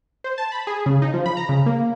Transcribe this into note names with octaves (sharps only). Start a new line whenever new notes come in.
C5
A5
B5
G#4
C#3
D#4
F3
B5
A#5
C#3
A#3